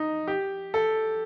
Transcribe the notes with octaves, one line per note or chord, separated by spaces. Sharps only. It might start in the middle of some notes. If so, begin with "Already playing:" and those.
Already playing: D#4
G4
A4